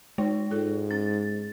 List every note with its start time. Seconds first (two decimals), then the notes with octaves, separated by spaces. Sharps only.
0.18 G#3 D#4 C5
0.51 G#2 F4 A4
0.91 C#4 A6